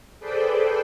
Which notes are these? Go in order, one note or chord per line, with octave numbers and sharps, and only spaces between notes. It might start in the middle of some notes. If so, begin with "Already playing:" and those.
G#4 A4 B4 C5 D5 G5